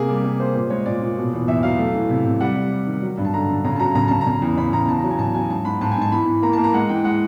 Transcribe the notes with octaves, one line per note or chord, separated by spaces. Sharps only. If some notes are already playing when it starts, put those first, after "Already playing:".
Already playing: C3 A#3 G#4
G3 G4
A#3
A#3 C5
A#2 C5
G#3 C#5
A#2 D5
A#2
B2
E2
E2 E5
F#3 F5
A3
E3
C3
C3
G3 F#5
G3
G3
D#3
F#3
G2
A5
D3 A#5
D3
C#3 A#5
A5
F#3 A#5
C#3 A#5
C#3 A5
A#5
C#3
E2
C#3 B5
E2 A#5
C#3 A5
A#5
F#3
G#5
C#3 A5
F#3 G#5
G#2 A5
G#2 B5
G#2 A5
G#5
G#2 A5
E3 B5
E3
A#3 A#5
A#3 A5
A#5
G#3 F#5
E3 G5
G#3 F#5